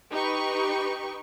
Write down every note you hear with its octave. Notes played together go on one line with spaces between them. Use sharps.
D#4 G4 B4 G5 C#6